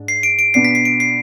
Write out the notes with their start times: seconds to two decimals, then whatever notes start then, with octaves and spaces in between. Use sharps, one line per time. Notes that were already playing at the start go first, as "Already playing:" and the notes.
Already playing: G#2 D4
0.08 C7
0.23 D7
0.39 D7
0.54 B2 B3 D4 C7
0.64 B6
0.75 C7
0.85 D7
1.00 C7